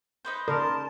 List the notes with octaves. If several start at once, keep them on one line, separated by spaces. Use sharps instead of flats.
D#4 B4 C5
C#3 A#4 D5 A5 C6